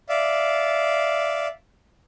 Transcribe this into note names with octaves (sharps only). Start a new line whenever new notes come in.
D5 E5 F5